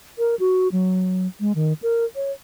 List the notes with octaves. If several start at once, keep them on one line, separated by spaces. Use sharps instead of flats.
A#4
F#4
F#3
G#3
D#3
A#4
C#5